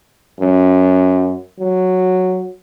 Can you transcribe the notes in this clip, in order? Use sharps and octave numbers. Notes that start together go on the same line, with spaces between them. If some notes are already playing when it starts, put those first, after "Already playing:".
F#2
F#3